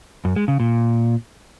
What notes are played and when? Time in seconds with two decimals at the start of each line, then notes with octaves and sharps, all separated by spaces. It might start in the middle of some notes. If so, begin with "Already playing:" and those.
0.25 F#2
0.36 G#3
0.48 C#3
0.60 A#2